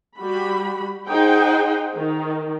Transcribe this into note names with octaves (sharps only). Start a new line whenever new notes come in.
G3 F#4 B5
D#4 G#4 C5 F#5 G5
D#3